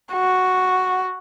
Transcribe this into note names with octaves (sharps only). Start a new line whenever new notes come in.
F#4